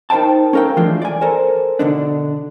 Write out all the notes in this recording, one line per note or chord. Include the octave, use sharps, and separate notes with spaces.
D#4 A#4 C5 G5 A5
C#4 A4 A#4 F5 G5
E3 F3 G#3 A3 D4 F4
D5 G#5
A4 A#4 C5
B2 D3 D4